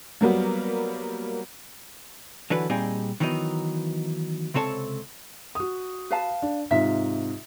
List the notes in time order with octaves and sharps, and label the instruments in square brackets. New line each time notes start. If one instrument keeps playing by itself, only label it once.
[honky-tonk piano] F#3 G3 A#3 B3
[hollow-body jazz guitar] D3 E3 F#3 B4
A#2 G3 C4 D#4 G4 G#4
D#3 E3 F#3 B3 D#4
C#2 C3 C4 A4 C#5 A5
[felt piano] F#4 D#6
[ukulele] B4 F5 A5
[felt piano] D4
[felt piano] G#2 C3 F4 [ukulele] E5